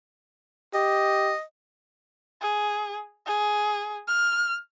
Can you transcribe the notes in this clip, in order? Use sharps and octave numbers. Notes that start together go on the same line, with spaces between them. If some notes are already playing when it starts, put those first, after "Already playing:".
G4 D#5
G#4
G#4
F6